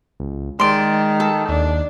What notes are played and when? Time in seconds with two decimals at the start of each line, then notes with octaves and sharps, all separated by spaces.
0.20 C#2
0.59 D#3 G#3 D5 C6
1.20 A4
1.49 D#2 D4